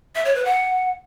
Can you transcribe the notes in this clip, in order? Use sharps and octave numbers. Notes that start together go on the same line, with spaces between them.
E5
C#5
B4
F#5